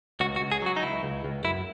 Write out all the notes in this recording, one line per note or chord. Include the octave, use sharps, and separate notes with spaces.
C#2 F#4
F#4
C#2
G#4
F#3 F#4
D#4
C#2 E4
C#2
C#2
F#2 E4